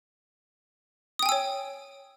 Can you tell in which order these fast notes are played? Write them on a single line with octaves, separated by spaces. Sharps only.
D#6 G5 G#5 E6 C#5